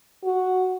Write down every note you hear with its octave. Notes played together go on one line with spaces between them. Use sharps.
F#4